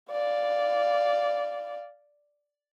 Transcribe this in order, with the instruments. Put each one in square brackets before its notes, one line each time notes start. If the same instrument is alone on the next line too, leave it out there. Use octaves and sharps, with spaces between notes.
[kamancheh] D5 F5